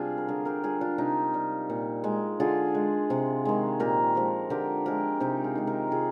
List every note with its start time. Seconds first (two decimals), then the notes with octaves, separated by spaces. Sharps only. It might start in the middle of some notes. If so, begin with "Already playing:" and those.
Already playing: C3 G3 D4 F4 G#4
0.17 A#4
0.28 D3 F4 G#4
0.45 G4 A#4
0.64 G3 F4 G#4
0.81 D4 F4
0.98 C3 D#4 G4
1.34 G3
1.70 A#2
2.04 G#3
2.40 D3 F4 G#4
2.74 G#3
3.10 C3
3.45 D#3 G#3
3.80 A#2 G4 A#4
4.15 F3 G#3
4.50 D3 G4 A#4
4.86 F3 G#3 G4 A#4
5.20 C3 D#4 G4
5.44 F4 G#4
5.55 D#3 G#3
5.67 G4 A#4
5.91 C3 F4 G#4